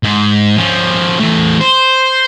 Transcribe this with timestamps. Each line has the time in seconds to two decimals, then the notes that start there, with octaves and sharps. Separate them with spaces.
0.03 G#2
0.57 F3 C#4
1.20 E2 A3
1.60 C5